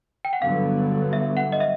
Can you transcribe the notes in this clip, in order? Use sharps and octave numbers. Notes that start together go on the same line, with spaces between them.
G5
F#5
G2 D3 F#3 B3 F5
E5
F#5
D#5
E5